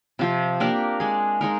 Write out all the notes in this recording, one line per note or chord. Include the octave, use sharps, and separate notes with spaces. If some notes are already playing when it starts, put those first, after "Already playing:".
C3 F3 C4
A#3 D4 G4 A#4
G#3 D4 G#4
G#3 D#4 A#4